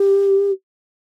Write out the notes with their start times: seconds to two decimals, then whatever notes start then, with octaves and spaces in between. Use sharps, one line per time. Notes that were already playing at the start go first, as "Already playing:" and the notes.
Already playing: G4